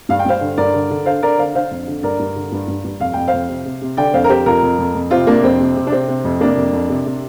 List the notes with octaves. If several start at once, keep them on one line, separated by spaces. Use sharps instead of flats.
G2 F5
G5
G2 C5 F5
D3
G2 A#4 D5
D3
D3
D3 C5 F5
D3 A#4 D5
D3 C5 F5
D3 C5 F5
F2
D3
G2 A#4 D5
G2
D3
G2
G2
G2
F2 F5
F2 G5
C5 F5
F2
C3
C3
C3
D3 D5 G5
F2 C5 F5
A#4
F2 G4 C5
F2 F4 A#4
F2
F2
F2
C3 C4 F4
C3 A#3 D4
F2 C4
C3
C3
D4
C3 C4
C3
F2
C3 A#3 D4
F2
F2
C3
C3